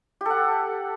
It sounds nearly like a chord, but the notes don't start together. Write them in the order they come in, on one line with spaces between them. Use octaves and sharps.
G4 A4 F#5